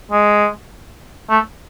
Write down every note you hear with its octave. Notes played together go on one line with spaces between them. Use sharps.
G#3
A3